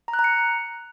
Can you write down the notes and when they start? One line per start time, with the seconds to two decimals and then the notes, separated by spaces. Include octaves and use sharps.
0.08 A#5
0.13 F#6
0.19 A#5
0.24 C#7